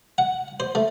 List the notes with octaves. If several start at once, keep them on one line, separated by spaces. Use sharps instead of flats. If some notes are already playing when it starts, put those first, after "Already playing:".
F#5
C5
A3